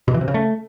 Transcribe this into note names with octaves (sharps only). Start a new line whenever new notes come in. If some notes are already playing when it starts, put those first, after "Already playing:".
B2
E3
C3
C#3
A3